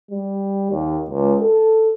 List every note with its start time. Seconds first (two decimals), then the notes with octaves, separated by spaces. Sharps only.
0.11 G3
0.71 D#2
1.10 C#2
1.41 A4